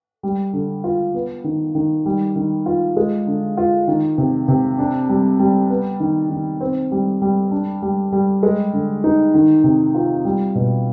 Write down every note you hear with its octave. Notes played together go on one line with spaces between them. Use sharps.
G3
D3
F4
B3
D#3
D#3
G3
D#3
F4
G#3
D3
F4
D#3
C3
C3
D4
G3
G3
B3
D#3
D#3
C4
G3
G3
D4
G3
G3
G#3
D3
D#4
D#3
C3
F4
G3
B2